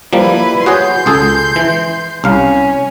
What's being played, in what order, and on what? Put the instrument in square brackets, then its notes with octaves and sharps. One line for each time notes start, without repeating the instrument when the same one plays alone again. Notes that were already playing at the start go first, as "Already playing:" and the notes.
[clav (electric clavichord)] F3 G3 A#3 [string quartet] E4 B4
[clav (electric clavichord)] F#4 G#4 C#5 [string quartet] C6 G6
[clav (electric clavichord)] C#2 G#4 A4
E3
[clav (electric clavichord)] C2 F5 [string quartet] C#4